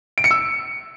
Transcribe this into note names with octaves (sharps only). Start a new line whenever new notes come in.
D7
C#7
E6